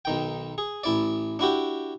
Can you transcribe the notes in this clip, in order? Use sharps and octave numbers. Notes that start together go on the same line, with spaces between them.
B1 D#3 G5
G#4
A1 E4 D5
D4 E4 F#4 G4